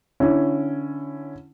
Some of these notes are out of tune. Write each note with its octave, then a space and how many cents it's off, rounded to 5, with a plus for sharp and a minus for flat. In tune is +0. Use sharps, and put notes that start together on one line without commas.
D3 +0 C#4 +0 E4 +10